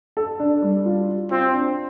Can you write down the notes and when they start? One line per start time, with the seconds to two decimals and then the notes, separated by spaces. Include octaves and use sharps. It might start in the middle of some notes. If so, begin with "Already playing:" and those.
0.17 A4
0.40 D4
0.62 G3
0.86 F4
1.09 F4
1.31 C4 F4
1.54 D4